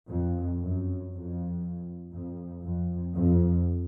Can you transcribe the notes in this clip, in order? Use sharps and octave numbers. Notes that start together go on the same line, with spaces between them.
F2
F#2
F2
F2
F2
F2